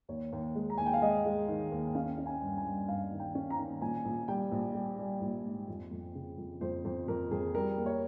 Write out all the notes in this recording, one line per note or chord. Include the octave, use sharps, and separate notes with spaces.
D#2 C#5
D#2
G#3
A#5
D#2 G#5
G5
F5
G#3 D#5
G#3
D#3
D#2
C#4 F5
C#4
G#5
G2
G#5
G2
G2 F5
D#3
G5
C#4
A#5
D#3
A#1 G#5
A#1
G3 G5
A#1
G3
G3
A#1
G#2
F2
F2
C#3
F2
F2 C5
F2 C5
F2 A#4
F2 G#4
G3 A#4
A#3
C#5